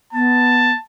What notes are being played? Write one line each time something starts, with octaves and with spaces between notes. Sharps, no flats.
B3 A5